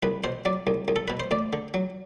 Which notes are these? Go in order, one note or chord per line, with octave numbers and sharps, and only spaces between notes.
C2 B4
B2 C5
F#3 D5
C2
C2
A4
B2 B4
C5
D2 D5
D3
F#3